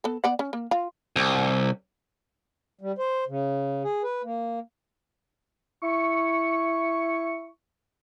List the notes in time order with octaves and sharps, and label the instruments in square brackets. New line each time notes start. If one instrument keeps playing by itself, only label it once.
[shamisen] B3 A4
B3 D5 F#5
C#4
A#3
F4
[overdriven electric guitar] C2
[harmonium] G3
C5
C#3
G#4
B4
A#3
[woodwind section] E4 C#6